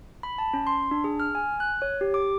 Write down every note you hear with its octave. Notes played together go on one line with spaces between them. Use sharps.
B5
A5
C#4
C6
D4
G#4
F6
G#5
F#6
C#5
G4
D6